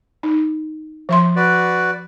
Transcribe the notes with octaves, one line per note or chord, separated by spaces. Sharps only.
D#4
F3 E5 C6
F#4 B4 D5